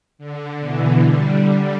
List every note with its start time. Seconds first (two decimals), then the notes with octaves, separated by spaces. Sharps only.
0.18 D3
0.60 B2 E3
1.01 D3 G3
1.42 D3 G3